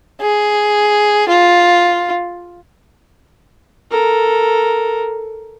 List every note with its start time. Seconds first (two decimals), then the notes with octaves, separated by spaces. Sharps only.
0.21 G#4
1.29 F4
3.91 A4 A#4